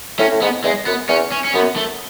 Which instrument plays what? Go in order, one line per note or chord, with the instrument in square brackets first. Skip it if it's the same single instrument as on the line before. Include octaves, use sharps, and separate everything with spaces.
[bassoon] A2 [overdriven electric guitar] C#4
[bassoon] A2
[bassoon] G#2 [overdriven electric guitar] B3
[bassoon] E2 [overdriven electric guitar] G#3
[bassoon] F#2 [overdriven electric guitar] B3
[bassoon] E2 [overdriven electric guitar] C#4
[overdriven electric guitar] C#4
C#4
[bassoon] F#2 [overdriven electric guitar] B3
[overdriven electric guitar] A3